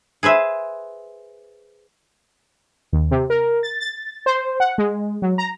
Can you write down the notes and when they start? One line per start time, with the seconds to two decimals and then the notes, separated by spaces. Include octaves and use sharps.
0.23 G#4 B4 C5 E5
2.92 D#2
3.11 C3
3.30 A#4
3.63 A6
3.80 A6
4.26 C5
4.60 F#5
4.78 G#3
5.22 F#3
5.38 A#5